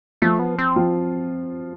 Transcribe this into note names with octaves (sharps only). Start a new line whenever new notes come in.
F3 A3 F4
B3
C4
F3 F4